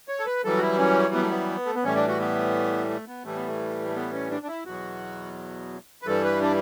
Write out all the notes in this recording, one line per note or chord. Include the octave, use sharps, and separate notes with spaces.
C#5
A4
B4
F#2 E3 G3 A4
F#4
E4
C#4
B3
A3
B3
A3
B3
A2 E3 G3 C#4
D4
F#4
B3
A3
B3
A2 E3 G3 A3
B3
A3
A3
B3
C#4
D4
D4
E4
E2 B2 F#3 F#4
B4
G2 E3 G3 A4
B4
D4